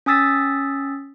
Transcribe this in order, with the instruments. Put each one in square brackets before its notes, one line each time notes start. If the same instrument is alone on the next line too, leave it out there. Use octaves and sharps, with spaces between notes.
[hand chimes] C#4 G#5 D#6 E6 A6 B6